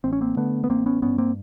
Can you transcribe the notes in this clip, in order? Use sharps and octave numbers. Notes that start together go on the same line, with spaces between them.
A1 C4
C#4
A#3 C4
D3 A3 B3
B3
A1 A#3 C4
B3 C#4
G2 B3 C#4
A#3 C4